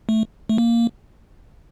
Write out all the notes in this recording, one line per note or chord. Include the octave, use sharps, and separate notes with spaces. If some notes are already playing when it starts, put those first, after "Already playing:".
A3
A3
A#3